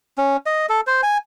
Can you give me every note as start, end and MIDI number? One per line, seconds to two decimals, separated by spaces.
0.18 0.37 61
0.46 0.66 75
0.69 0.81 69
0.87 1.01 72
1.03 1.18 80